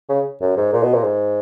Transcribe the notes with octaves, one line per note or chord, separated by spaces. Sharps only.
C#3
F#2
G#2
A#2
B2
A#2
G#2